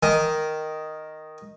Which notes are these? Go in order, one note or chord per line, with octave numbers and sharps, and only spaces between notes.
D#3